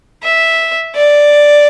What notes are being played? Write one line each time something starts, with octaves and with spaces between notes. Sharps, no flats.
E5
D5